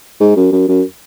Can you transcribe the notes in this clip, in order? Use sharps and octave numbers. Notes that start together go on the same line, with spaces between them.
G#2
F#2
F#2
F#2